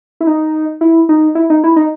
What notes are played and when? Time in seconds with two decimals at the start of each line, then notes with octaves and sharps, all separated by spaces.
0.21 E4
0.27 D#4
0.81 E4
1.09 D#4
1.35 E4
1.50 D#4
1.64 E4
1.76 D#4